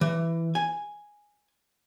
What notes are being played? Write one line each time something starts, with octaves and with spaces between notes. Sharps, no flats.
E3
G#5